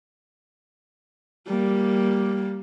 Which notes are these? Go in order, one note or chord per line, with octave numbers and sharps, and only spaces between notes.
G3 A#3